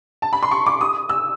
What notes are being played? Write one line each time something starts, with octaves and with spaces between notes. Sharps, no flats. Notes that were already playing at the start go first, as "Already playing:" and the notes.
A5
B5
C6
C#6
D6
D#6
E6